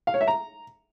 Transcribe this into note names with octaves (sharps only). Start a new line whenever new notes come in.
F5
C#5
E5
A#5